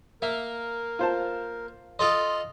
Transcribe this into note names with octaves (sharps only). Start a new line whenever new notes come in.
A#3 A#4 E5
F4 C5 A5
F4 A4 D#5 C6 D#6